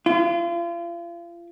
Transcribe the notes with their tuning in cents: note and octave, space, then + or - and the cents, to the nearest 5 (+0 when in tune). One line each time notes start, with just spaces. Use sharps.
F4 -35